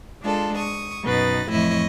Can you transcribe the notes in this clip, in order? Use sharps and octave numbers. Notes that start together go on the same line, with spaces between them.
G#3 D4 F4 A4
C#6 D#6
F#2 B2 D#4 B4 A6 A#6
F2 A2 E3 E4 D#5 C#6